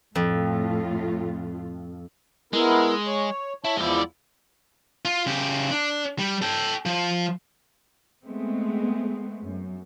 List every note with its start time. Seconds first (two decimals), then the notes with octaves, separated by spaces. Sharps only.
0.16 F2 A2 A3 F4
2.53 G#3 B3 E4 A#4
3.07 C#5
3.64 E4 C#5 A5
3.77 E2 F3 G#3 E4 D5
5.05 F4
5.26 C#3 G4
5.71 D4
6.19 G3
6.42 A4 G5
6.86 F3
8.23 G#3 A3 B3 C4
9.42 F#2